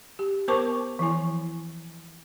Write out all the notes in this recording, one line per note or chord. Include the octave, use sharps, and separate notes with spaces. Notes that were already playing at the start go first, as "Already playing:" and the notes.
G4
B3 A#4 C5 A5 C#6 D6
E3 F3 E4 G#5